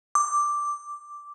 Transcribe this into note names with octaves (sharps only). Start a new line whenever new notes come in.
D6